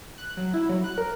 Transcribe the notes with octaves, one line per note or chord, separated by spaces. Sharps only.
F#6
F#3
E4
F#3
F#6
A#4